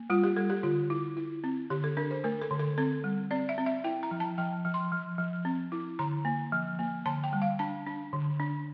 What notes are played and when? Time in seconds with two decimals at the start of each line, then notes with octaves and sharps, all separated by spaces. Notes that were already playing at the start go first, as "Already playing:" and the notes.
Already playing: A#3
0.10 G3 F4
0.23 G4
0.36 G3 A4
0.50 G4
0.63 D3 F4
0.90 E4
1.17 E4
1.44 C4
1.70 D3 G4
1.84 A4
1.97 D4 A#4
2.11 C5
2.24 A3 A#4
2.41 A4
2.51 D3
2.59 A4
2.78 C4 A4
3.04 G3
3.31 C4 D5
3.49 E5
3.58 C4
3.66 E5
3.84 E4 G5
4.03 A#5
4.11 F3
4.20 A5
4.38 F3 G5
4.65 F3
4.74 C6
4.92 F3
5.18 F3
5.45 C4
5.72 E4
5.99 D3 A#5
6.25 A#3
6.52 F3
6.79 A#3
7.06 D3 A5
7.24 G5
7.33 G3
7.42 F5
7.59 D4 A5
7.86 D4
8.13 D3
8.40 D4